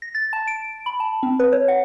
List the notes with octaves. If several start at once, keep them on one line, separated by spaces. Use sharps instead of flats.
A#6
A6
A5
D7
B5
A5
C4
B4
C#5
F#5